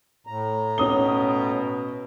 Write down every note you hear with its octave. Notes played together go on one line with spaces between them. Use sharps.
A2 A#5
B2 C#4 D#6 G7